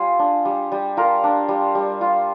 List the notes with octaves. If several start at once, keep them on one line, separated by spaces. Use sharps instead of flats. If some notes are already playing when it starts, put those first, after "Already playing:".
Already playing: G3 F4 G#4
D4
G3
G3
F4 A#4
D4
G3
G3
F4